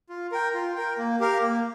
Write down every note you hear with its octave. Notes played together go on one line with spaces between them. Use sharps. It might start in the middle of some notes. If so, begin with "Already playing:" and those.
F4
A#4 G5
F4
A#4 G5
A#3
G4 A#4 F5
A#3